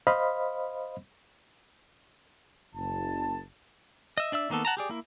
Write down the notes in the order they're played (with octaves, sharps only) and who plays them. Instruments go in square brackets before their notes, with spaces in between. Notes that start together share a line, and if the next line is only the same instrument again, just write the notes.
[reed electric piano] C5 D#5 F5 B5
[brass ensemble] F#1 A5
[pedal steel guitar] D#5 E5
D4 D5 E5 E6
D#3 A#3 B3 A4
F#5 A5 A#5
G4 G#4 D5
A#3 E4